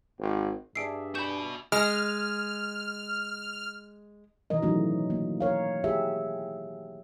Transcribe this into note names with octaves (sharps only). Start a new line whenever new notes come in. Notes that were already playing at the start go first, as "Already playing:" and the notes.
G#1
G2 D4 G#4 E5 C7 D7
F#4 G#5 B5 G6 E7
G#3 F6
B2 D#3 E3 G3 A#4 D#5
E3 F#3 A3 C#4 D#4 F#4
A#3
A#4 C#5 F5
G4 G#4 E5